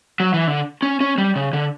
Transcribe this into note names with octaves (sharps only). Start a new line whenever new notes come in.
F#3
E3
D3
C#4
C#4
G3
C#3
D3